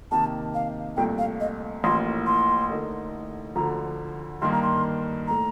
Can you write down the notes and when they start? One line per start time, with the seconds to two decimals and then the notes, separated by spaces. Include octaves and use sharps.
0.11 C3 D#3 A#3 D#4 G4 A5
0.54 F5
0.97 C2 A#2 A3 G5
1.18 F5
1.40 D#5
1.84 A1 A2 F3 A#3 C6
2.26 C6
2.70 D3 A3 D#4 A#4
3.55 D2 D3 F3 A#5
4.42 G2 D#3 A#3 C6
4.52 A#5
4.62 C6
5.28 A2 A3 A#5